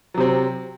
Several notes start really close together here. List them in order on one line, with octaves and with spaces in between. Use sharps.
F#3 C3 C4